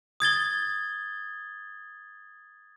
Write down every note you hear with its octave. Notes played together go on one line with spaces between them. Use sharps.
D#6 G#6 A6 G7